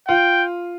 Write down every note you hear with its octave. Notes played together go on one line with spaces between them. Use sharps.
F4 G5